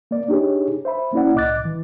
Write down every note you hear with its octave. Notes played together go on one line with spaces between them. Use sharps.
A#3 D5
D4 D#4 G4 G#4 C#5
C5 E5 B5
A#3 C#4 E4 D5 F#5
C2 A2 D#5 D6 F#6 A6
E3